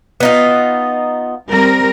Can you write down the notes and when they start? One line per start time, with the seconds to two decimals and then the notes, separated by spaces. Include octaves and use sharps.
0.20 B3 D#4 F4
1.49 G3 C4 A#4